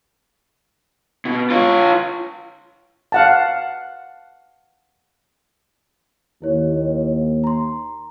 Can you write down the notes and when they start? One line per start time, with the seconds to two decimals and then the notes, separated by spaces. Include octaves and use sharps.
1.25 B2
1.50 F4 C#5
3.12 F5 F#5 A5
6.42 D#2 E4 C#5
7.44 A#5 C6